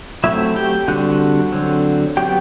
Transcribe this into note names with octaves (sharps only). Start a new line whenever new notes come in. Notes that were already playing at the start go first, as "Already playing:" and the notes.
F#3 A3 C4 E4 E5
G4 G5
D3 G3 C4 F#4 F#5
D3 F#3 C4
F#3 B3 G4 G5